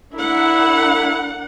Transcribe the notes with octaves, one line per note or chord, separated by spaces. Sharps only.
D4 E4 A#4 F#5